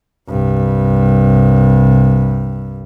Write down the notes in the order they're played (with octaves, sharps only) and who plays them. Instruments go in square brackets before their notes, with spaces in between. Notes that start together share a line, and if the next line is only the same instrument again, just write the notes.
[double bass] C2 G2